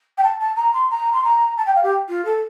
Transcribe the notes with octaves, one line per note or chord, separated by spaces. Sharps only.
G5
A5
A5
A#5
C6
A#5
C6
A#5
A5
G5
F5
G4
F4
A4